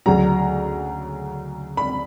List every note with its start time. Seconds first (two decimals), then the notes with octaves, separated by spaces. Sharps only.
0.06 D2 C#3 F#3 A#5
1.77 B5